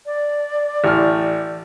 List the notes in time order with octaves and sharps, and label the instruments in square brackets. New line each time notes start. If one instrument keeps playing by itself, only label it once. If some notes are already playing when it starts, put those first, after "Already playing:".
[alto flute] D5
[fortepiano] A1 F6